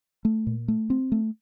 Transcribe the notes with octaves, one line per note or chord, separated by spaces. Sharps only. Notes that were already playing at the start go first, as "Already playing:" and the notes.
A3
A#2
A3
C4
A3